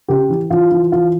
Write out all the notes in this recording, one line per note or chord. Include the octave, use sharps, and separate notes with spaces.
C#3 G4
E3
E3 F4
E3
E3 F4